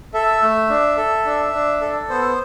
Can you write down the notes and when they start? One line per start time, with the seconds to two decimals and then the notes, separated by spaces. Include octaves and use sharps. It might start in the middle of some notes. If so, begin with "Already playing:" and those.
0.14 A4 E5
0.42 A3
0.70 D4
0.97 A4
1.26 D4
1.53 D4
1.81 A4
2.10 B3 C5